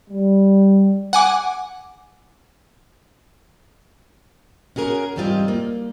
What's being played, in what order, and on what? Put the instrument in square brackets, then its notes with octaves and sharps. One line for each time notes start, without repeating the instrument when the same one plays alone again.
[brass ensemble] G3
[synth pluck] F#5 G#5 D6
[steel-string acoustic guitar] C#4 F#4 G#4 A#4
E2 G#2 G3 C4 F4 D#5
A#3